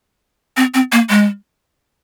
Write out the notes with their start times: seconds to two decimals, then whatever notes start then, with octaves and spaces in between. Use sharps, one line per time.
0.57 C4
0.74 C4
0.92 A#3
1.09 G#3